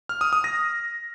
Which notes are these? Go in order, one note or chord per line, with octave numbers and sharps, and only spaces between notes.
F6
D#6
D#6
A#6